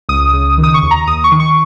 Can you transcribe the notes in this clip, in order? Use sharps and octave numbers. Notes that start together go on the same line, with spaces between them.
C#2 D#6
C#3
D#3
D#6
C#6
D#2
A#5
D#2 D#6
C#6
D#3
C#6